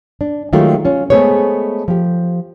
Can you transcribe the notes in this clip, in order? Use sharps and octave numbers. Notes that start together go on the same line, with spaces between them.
D4
D#3 F#3 G#3 A3 F4 G4
C#4 F4
G#3 A3 B3 G#4 C5 C#5
F3 G4